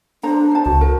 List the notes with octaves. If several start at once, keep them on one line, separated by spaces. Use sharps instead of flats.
D4 C5 A#5
C5 A5
C#2 F#4
A#4